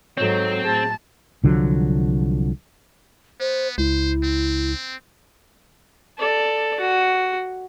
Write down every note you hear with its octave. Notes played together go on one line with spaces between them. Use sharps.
G#2 F#3 C4 A4 C#5
A2 G#4 A5
C2 D3 F3 F#3
B3 C5
C#2 E4 C5
C4
A4 D5
F#4